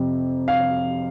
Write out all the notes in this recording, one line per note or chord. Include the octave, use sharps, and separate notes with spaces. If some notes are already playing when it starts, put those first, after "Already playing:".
Already playing: F2 C3
F5